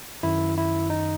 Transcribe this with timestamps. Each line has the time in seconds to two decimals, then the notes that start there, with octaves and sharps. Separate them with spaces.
0.23 F#2 D#3 E4
0.57 E4
0.90 D#4